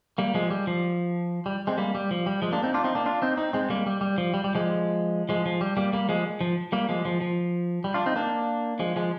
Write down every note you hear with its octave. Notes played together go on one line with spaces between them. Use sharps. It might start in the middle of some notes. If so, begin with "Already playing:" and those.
G3 A#3
F3 G#3
G3
F3
G3
G#3 C4
G3 A#3
G3
F3
G3
F3 G#3
A#3 D4
C4 D#4
D4 F4
C4 D#4
A#3 D4
D4 F4
C4 D#4
C4 D#4
G#3 C4
G3 A#3
G3
G3
F3
G3
G3
F3 G#3
F3 G#3
F3
G3
G3 A#3
G3 A#3
F3 G#3
F3
G3 A#3
F3 G#3
F3
F3
G3
D4 F4
C4 D#4
A#3 D4
F3 G#3
F3 G#3